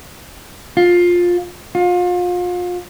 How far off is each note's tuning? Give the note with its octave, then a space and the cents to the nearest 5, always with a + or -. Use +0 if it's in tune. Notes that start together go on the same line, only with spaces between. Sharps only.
F4 +15
F4 +35